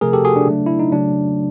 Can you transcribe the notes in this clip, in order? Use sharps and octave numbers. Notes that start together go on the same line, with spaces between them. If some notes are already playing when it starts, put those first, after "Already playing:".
C3 F3 A3 G#4 A#4
G4 A4
F#4 G#4
D4
C#3 F#3 A3
E4
D#4
C#3 F#3 A3 D4